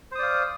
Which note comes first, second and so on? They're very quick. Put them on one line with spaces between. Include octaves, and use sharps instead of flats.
C5 D#6 D5 F5